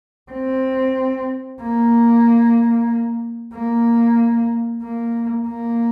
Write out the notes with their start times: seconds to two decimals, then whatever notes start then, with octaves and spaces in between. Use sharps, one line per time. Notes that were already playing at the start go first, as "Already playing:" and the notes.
0.31 C4
1.61 A#3
3.53 A#3
4.83 A#3
5.47 A#3